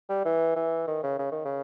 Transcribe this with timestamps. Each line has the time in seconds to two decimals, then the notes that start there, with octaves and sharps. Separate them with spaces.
0.09 G3
0.25 E3
0.56 E3
0.88 D#3
1.03 C#3
1.19 C#3
1.32 D#3
1.45 C#3